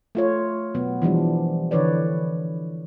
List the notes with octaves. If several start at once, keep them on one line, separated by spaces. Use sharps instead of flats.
A3 F4 C#5
B2 F#3 B3
E3 F3 G3 D4
D3 E3 B4 C#5 D5